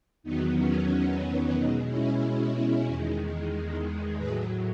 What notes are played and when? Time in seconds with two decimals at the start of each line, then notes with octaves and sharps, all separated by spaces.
0.23 E2 D#3 F#3 B3 D#4
0.55 C#4
1.54 B2 G#3 B3 D#4
1.87 C#4 E4
2.86 E2 D#3 G#3
4.17 A2 F#3 G#4 B4